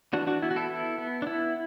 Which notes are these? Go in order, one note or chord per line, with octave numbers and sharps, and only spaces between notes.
E3 D4 F#4
D4 F#4
B3 E4
F#4
E4 A4
B3
B3
D4
B3 E4